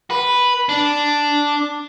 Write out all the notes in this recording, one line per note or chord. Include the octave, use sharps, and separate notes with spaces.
B4
D4